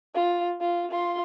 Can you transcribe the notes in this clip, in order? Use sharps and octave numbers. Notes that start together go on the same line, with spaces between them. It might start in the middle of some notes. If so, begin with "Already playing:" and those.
F4
F4
F4 C6